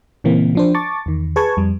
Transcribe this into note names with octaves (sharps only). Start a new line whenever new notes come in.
A#2 C#3 E3 A#3 C4
F3 D4 C5
A5 C#6 D6 A6
E2 D#3
G#4 B4 A5 C#6 G#6
F2 G3